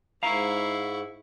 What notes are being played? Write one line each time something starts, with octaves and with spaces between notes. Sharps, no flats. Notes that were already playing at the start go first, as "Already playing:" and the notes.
G#2 E4 F5 A#5 C#6